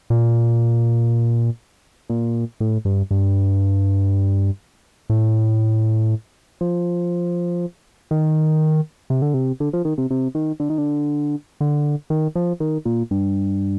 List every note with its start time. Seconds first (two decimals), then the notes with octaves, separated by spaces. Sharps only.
0.10 A#2
2.10 A#2
2.60 A2
2.85 G2
3.11 G2
5.10 A2
6.61 F3
8.11 D#3
9.10 C3
9.22 D3
9.34 C3
9.60 D3
9.73 F3
9.85 D#3
9.98 C3
10.11 C3
10.35 D#3
10.60 D3
10.70 D#3
10.78 D3
11.61 D3
12.10 D#3
12.35 F3
12.60 D#3
12.85 A#2
13.11 G2